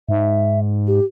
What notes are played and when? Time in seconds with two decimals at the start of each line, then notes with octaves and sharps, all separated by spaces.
0.09 G#2 E5
0.87 G4